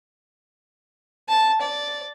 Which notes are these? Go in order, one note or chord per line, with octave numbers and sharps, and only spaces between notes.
A5
D5